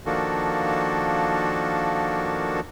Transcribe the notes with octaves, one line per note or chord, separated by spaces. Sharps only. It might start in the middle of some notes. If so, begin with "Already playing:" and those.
D#3 F3 A#3 D4 F#4 A4